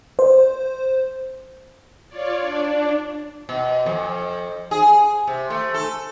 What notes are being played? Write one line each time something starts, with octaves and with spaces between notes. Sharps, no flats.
C5
F4 C#5 D5
D4
B2
F2
G#4
C3
A3
A4